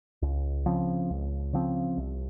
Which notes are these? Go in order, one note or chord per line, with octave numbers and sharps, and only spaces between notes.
C#2
C#3 F3 C4
C#2
C#3 F3 C4
C2